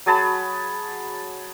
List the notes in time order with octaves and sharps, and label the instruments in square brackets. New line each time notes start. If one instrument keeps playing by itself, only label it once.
[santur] F#3 G#4 A5 B5